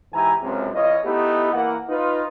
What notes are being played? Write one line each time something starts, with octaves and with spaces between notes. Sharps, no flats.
G#2 E3 G4 E5 G#5 A#5
C#2 F#2 C3
E2 F4 C#5 D#5
A3 B3 D#4 E4 G4
E3 A#3 F#5
D#4 F4 B4